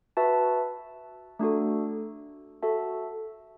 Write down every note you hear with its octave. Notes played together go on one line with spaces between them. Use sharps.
F#4 B4 E5 A5
A3 D4 F#4 A4
F#4 A4 E5 A5